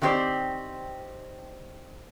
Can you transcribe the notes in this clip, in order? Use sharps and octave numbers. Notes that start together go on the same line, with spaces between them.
D#3 A3 C4 G4 C5 D5